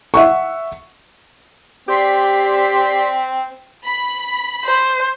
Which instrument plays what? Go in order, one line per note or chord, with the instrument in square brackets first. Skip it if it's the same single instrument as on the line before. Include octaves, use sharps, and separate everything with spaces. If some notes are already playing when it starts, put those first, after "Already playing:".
[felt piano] E5 F#5 C#6
[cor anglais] C4 [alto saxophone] G4 [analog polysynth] D5 C6 B6
[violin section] B5
[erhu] C5